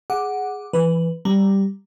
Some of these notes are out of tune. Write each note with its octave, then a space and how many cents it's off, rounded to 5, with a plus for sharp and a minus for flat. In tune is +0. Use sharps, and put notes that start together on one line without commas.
G#4 +0 F#5 +0 D6 +0
E3 +25 B4 +0
G3 +0 A#5 +0